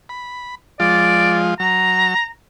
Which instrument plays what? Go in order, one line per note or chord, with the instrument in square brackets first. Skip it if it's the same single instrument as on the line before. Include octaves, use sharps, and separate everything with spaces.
[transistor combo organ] B5
[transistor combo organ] F3 G#3 F4 [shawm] D5
[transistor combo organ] F#3 [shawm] A#5